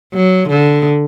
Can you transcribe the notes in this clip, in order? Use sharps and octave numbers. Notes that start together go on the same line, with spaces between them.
F#3
D3